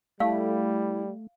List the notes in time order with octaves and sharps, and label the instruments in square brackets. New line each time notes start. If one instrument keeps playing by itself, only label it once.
[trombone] G3 [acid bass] A3 [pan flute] E4 [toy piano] F5